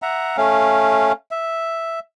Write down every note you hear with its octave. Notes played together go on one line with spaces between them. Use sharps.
E5 F#5 A#5
A3 C#4 F5
E5